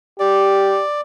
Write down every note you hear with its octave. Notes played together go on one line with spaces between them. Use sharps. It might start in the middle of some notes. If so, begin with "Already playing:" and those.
G4 D5